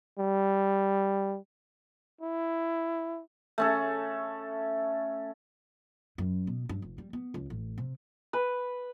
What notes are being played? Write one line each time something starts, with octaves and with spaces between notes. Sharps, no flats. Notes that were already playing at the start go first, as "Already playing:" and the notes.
G3
E4
A3 C#4 A4
F#2
B2
G2
F1
G3
B3
C#2
A1
C3
B4